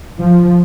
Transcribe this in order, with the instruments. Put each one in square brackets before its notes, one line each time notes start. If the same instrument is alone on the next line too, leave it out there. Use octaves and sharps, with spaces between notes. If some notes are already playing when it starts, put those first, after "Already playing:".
[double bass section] F3